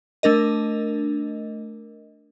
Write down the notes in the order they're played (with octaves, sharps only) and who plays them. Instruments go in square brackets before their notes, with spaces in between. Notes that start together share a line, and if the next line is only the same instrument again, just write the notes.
[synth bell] A3 D4 A#4 D#5